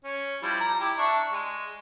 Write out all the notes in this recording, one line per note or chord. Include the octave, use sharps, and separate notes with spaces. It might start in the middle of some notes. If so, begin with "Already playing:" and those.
C#4
F3 G3 E4
A#5
E4 G4
D4 E5 C#6
G#3